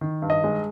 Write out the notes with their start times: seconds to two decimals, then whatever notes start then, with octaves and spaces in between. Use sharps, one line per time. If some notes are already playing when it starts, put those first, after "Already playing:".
0.01 D#3
0.22 G2
0.30 D#5
0.44 G#3